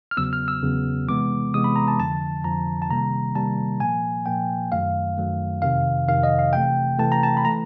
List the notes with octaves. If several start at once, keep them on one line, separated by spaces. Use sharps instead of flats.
F6
E2 C#3 F#3 B3 E6
F6
E6
E2 C#3 F#3 B3
C3 E3 G#3 B3 D6
C3 E3 G#3 B3 D#6
B5
A#5
A5
F2 D3 F3 A5
F2 D3 F3 A#5
A5
C3 D#3 G3 A#3 A#5
C3 D#3 G3 A#3 A5
A#2 F3 A#3 G#5
A#2 F3 A#3 G5
F#2 D#3 F#3 A3 F5
F#2 D#3 F#3 A3
F2 C3 D#3 F5
F2 C3 D#3 F5
D#5
F5
C3 E3 A3 G5
C3 E3 A3 A5
A#5
A5
B5
E3 A3 A#5